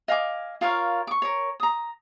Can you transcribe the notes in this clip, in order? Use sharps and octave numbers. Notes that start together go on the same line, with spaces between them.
D#5 F5 G#5 D6
F4 A#4 C#5 F5
C#6 D6
A#4 C#5
A#5 D#6